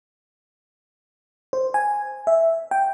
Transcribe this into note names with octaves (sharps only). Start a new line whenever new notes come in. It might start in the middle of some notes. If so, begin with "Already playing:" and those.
C5
G#5
E5
G5